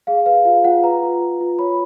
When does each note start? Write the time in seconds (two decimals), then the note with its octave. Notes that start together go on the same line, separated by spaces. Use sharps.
0.07 G#4 F5
0.26 B4 F5
0.45 F4 F5
0.64 F4 F#5
0.84 B4 A#5
1.03 F4
1.21 B4
1.41 F4
1.59 C#5 B5